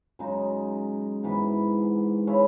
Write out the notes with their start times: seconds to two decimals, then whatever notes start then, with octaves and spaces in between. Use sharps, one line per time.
0.19 F#2 C#3 G#3 D#4
1.23 G#2 E3 B3
2.27 C#3 G#3 C#4 E4